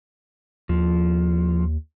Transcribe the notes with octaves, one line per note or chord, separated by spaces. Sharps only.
D#2 F3